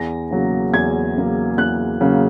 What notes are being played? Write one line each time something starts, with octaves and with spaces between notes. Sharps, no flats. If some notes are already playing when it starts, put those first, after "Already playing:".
Already playing: E2 A#6
C#3 F#3 A#3
E2 G#6
C#3 F#3 A#3
E2 F#6
C#3 F#3 A#3